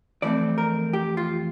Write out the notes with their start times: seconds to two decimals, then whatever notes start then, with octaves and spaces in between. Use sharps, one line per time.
0.22 F2 E3 A3 C4 D5
0.58 A#4
0.93 G4
1.17 F4